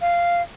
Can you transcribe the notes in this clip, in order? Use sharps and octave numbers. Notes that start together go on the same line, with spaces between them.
F5